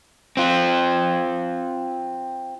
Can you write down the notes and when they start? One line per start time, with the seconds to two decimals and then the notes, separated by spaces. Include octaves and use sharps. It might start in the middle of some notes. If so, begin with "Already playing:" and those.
0.37 C4 F4